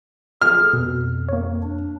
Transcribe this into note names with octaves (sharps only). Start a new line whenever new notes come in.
G#4 A4 F6
F2 B2
A#3 C#5
D4